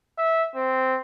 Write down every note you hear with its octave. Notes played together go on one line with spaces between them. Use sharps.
E5
C4